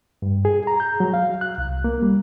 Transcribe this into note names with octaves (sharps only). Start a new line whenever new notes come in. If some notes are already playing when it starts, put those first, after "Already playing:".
G2
G#4
A#5
G6
F#3
F5
F#6
C2
A#3
G3